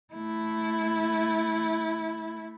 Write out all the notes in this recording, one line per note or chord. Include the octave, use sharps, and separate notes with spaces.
A3 E4